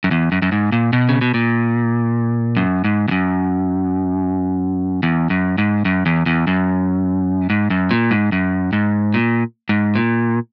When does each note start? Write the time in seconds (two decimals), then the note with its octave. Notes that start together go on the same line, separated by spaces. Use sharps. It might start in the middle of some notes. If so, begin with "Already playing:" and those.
0.04 F#2
0.11 E2
0.32 F#2
0.42 F#2
0.52 G#2
0.72 A#2
0.93 B2
1.09 C#3
1.21 B2
1.34 A#2
2.56 F#2
2.84 G#2
3.08 E2
3.11 F#2
5.03 E2
5.30 F#2
5.58 G#2
5.85 F#2
6.06 E2
6.26 E2
6.47 F#2
7.50 G#2
7.70 F#2
7.91 A#2
8.11 G#2
8.32 F#2
8.73 G#2
9.14 A#2
9.69 G#2
9.95 A#2